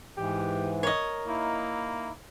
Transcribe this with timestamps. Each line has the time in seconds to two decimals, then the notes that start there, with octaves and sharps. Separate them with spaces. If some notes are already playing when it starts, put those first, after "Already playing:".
0.17 G#2 E3 G4
0.83 A#4 C#5 D#5
1.27 A#3 D#4 E4